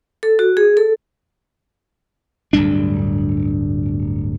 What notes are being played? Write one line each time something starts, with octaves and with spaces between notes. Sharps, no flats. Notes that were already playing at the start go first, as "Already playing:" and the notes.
A4
F#4
G#4
A4
D1 D2 G2 D4